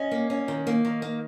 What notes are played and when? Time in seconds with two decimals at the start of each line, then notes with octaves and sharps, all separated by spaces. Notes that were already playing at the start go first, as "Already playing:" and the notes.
Already playing: C#4 D#5
0.11 A#3
0.30 C#4
0.48 D#3
0.67 A#3
0.85 D#3
1.02 A#3